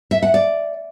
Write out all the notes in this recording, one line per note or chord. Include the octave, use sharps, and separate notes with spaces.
E5
F#5
D5